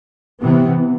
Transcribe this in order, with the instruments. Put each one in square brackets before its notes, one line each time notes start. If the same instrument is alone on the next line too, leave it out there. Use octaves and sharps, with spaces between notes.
[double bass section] C3 E3 B3